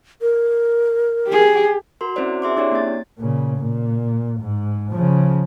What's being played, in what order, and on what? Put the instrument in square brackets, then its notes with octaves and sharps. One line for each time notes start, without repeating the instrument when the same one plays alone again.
[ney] A#4
[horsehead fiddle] G4 G#4
[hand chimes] F#4 A#4 C6
C4 C#4 E4 F#4 C5 D5
G#4 E5 C6 D6
C4 D4 E4 G4 C#5 D5
A#3 C#4 A6
[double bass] A#2 C#3
A#2
G#2
C#3 F3